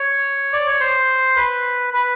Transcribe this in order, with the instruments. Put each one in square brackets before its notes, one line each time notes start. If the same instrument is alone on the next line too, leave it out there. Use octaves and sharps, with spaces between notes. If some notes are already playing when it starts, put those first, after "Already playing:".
Already playing: [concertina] C#5
D5
C#5
C5
B4
B4